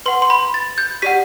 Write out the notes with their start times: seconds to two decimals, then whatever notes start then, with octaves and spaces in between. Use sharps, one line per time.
0.06 B4 F#5 C6
0.22 C6
0.30 B5
0.54 A6
0.78 G6
1.02 G4 D5 F#5 B6